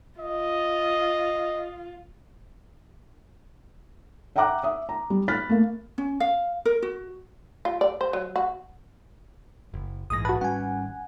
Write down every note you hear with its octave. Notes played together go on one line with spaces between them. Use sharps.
F4 D#5
E5 F#5 G5 A#5 D6 F#6
E5 D#6
A#5
G3
B5 F6 F#6 A6 B6
A3 A#3
C#4
F5
A#4
F#4
F4
D5
C5
F#3
F#4
F#1
A#1 G#2 E3 D#6 A#6
F#4 B4 A5
G#1 G3 C#4 F#5 G#5